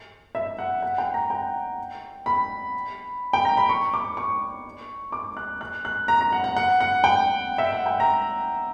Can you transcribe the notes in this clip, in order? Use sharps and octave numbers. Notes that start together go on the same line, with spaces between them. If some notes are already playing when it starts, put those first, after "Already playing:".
E5
F#5
F#5
G5
A#5
G5
B5
G5
A#5
B5
C#6
D6
C#6
D6
F#6
F#6
F#6
A#5
A#5
F#5
F#5
F#5
F#5
G5
E5
F#5
G5
A#5